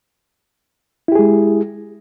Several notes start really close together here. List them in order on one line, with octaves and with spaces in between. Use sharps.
E4 G4 G#4 G#3